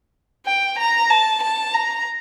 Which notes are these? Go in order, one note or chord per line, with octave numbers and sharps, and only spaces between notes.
G5
A#5
A5
A5
A#5